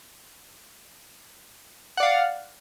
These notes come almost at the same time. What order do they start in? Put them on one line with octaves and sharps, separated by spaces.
F#5 D5 F5